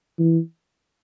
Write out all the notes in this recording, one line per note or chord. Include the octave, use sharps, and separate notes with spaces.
E3